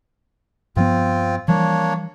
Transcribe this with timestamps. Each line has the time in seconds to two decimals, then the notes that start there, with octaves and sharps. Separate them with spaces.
0.76 G2 F3 B3 C4 F4
1.48 E3 F3 G3 A#3 D4 C#5